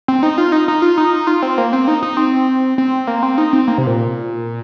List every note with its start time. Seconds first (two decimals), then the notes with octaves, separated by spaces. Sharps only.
0.08 C4
0.23 D#4
0.38 F4
0.52 D#4
0.68 D#4
0.82 F4
0.98 D#4
1.27 F4
1.42 C4
1.58 A#3
1.73 C4
1.88 D#4
2.03 D#4
2.17 C4
2.78 C4
3.07 A#3
3.23 C4
3.38 D#4
3.53 C4
3.68 A#3
3.78 C3
3.87 A#2